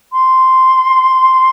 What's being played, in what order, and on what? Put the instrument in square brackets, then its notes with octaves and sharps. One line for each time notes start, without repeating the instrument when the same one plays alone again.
[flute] C6